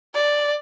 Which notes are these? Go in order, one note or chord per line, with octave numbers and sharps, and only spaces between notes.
D5